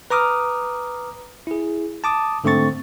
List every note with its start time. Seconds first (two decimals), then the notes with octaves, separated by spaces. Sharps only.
0.10 B4 A#5 D6 D#6 F6
1.47 E4 G#4
2.04 A5 D6 D#6
2.44 G#2 D3 A3 C4 C#6 A6